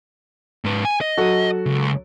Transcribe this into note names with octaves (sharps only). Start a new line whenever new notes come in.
G#2 B4
G#5
D#5
F#3 F#4 A4
C#2